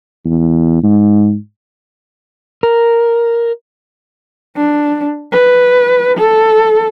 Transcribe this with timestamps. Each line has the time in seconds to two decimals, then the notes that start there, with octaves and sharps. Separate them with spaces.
0.25 E2
0.83 G#2
2.63 A#4
4.56 D4
5.32 B4
6.17 A4